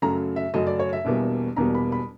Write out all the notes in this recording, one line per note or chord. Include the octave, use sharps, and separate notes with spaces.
F#2 C#3 F#3 A3 A#5
E5
F#2 C#3 F#3 A3 D#5
D5
C#5
E5
E1 E2 B2 G3 A#3
E1 E2 B2 G3 A#3 A#5
B5
B5